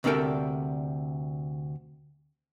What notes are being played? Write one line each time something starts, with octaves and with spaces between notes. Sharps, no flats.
D2 C3 D4 A4 A#4 G5